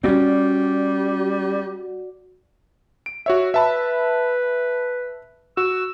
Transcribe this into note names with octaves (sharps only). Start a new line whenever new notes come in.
G3 C4 C#4 F#4 D5 F#5
D7
F#4 C#5 E5
B4 E5 A5 B5
F#4 E6